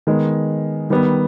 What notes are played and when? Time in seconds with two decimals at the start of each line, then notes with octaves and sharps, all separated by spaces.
0.07 D#3 G#3 B3
0.90 D#3 G3 B3